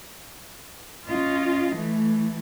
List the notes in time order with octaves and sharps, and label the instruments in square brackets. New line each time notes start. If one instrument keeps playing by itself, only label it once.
[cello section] C#4 F4 D#5
E3 A3